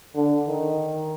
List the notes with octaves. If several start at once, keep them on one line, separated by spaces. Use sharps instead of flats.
D3
D#3